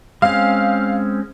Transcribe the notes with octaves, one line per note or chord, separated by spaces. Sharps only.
G#3 C4 C#4 F5